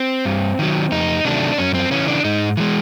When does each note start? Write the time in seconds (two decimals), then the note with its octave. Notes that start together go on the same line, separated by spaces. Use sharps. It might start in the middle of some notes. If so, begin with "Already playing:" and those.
Already playing: C4
0.25 G2
0.59 D#3 F#3
0.92 F2 D#4
1.25 C3 D#3 F#3 A3 D4
1.58 F#2 C#4
1.74 C4
1.91 C#3 E3 C#4
2.08 D4
2.25 G#2 D#4
2.57 E3 G#3